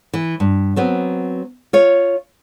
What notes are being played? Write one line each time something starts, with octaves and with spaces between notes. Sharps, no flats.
E3
G2
F#3 B3 C4
F4 C#5